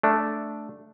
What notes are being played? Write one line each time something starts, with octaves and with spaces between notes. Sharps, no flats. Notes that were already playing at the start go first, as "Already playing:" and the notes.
A3 D4